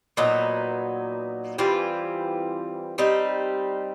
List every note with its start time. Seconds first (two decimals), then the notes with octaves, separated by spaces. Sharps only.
0.17 A#2 F#3 B3 D#4
1.58 E3 G3 C4 F4
2.98 G3 C4 D#4